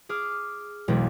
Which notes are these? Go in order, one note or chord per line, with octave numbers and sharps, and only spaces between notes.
G#4 D6 F6
E1 B1